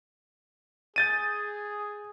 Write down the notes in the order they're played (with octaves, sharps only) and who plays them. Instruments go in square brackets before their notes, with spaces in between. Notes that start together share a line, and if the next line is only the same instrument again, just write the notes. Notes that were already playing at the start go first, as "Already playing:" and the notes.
[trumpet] G#4 [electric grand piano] G6 A6 D#7